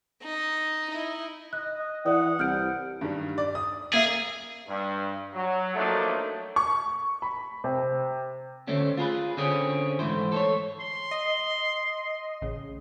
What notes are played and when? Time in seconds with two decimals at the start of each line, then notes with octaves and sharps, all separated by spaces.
0.24 D#4
0.90 D#4 E4
1.53 D#5 F#6
2.06 E3 D5 F#5 D#6
2.39 C2 F6 G6 D7
3.01 G2 D#3 G3
3.38 D5
3.55 D#6
3.94 A#3 G#4 E5
4.67 G2
5.33 F#3
5.75 F3 F#3 A3 A#3 D4 D#4
6.56 C#6
7.22 B5
7.64 C3
8.67 D2 A3 C4 C#4 G4
8.97 F4 G#4 A#4 B4
9.37 D3 C4 C#4 G4 G#4
9.99 G#2 E3 A3 C5
10.32 A4 C5 C#5
10.81 C6
11.11 D#5
12.42 A1 C#3